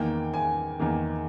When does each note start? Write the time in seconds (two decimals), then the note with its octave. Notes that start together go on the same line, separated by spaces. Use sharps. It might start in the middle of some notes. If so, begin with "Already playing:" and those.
Already playing: E2 D#3 A#3 G5
0.34 G#5
0.79 E2 D#3 A#3